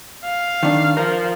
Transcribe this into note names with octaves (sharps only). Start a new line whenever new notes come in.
F5
D#3 D4
F3 A#4